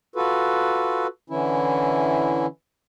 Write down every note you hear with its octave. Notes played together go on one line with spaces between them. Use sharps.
F4 F#4 A4 B4
D3 E3 C#4 E4